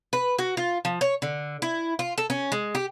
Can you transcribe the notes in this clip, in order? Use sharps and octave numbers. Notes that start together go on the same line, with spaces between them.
B4
F#4
F4
F3
C#5
D3
E4
F4
A4
C#4
G#3
G4